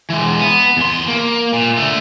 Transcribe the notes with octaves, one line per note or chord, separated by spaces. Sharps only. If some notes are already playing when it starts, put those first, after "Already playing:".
E3 G#3
B3
E2 C6
A#3
A#2
D3 A3